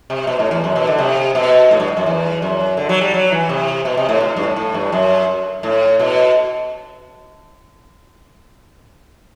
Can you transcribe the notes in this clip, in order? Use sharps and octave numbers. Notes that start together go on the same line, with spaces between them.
C3
B2
A2
E2
F#2
B2
D3
C3
B2
A2
G2
F#2
E2
F#2
D3
F#3
G3
F#3
E3
C3
B2
C3
A2
B2
A2
G2
A2
A2
G2
F#2
A2
B2